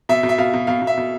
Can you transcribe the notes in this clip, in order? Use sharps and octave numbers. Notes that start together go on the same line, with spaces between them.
B2 E5
B2
E5
B2 F5
B2
B2 F5
B2
E5
B2